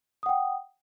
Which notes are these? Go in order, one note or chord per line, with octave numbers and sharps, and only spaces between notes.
F#5 G5 D#6